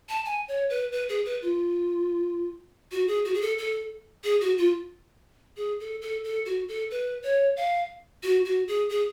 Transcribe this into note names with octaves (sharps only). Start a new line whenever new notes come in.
A5
G#5
C#5
B4
B4
G#4
B4
F4
F#4
G#4
F#4
G#4
A4
A4
G#4
F#4
F4
G#4
A4
A4
A4
F#4
A4
B4
C#5
F5
F#4
F#4
G#4
G#4